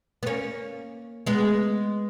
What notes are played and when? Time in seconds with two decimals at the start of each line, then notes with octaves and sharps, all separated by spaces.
0.23 B3
0.26 A#3 C#4
1.26 G#3 B3